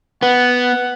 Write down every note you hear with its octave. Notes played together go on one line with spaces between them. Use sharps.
B3 F#5